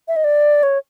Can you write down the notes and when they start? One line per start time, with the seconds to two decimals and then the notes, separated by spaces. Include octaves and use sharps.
0.08 E5
0.16 D#5
0.24 D5
0.63 C#5